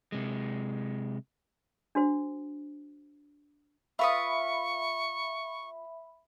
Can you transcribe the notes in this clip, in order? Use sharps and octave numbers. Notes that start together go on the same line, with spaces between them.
C3 G#3
D4 F#4 C5
F4 B4 E5 B5 C#6 D#6